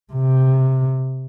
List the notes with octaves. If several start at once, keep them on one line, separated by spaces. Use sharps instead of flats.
C3